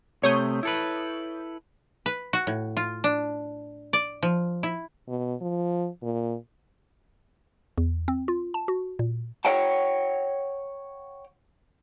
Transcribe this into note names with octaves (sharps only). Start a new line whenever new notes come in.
C3 A3 C#5 D#6 G6
E4 A4 B4
B4
F#4
A2
F4
D4
D5
F3
E4
B2
F3
A#2
E2
C4
F4
A5
F#4
A#2
C#5 F#5 G5 A5